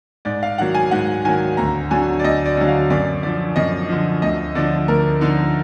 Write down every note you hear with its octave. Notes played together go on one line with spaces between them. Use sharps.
G#2 D5
F5
D#3 F#3 F#5
G#5
G#2 F#5
D#3 F#3 G#5
D2 A#5
D3 F#3 G#5
D5
D2 D#5
D5
D3 F#3
F5
F#2 D5
D3 F3 D5
F#2 D#5
D3 F3
D2 D#5
D3 F3 D5
D2 A#4
D3 F3 D#4